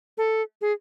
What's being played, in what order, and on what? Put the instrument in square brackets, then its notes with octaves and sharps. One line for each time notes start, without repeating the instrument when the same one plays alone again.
[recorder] A4
G#4